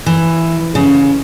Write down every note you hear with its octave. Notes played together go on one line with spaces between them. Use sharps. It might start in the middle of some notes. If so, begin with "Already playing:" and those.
E3
C#3